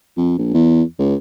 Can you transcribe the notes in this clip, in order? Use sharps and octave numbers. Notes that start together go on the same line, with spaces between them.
F2
A#1
E2
C#2